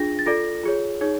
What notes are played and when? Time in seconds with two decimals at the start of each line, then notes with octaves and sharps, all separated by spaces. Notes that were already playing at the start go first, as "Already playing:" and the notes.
Already playing: D4 F4 G#4 A#6
0.19 A6
0.26 F4 A4 D5 A#6
0.63 F4 G#4 C#5
1.01 D#4 G#4 C#5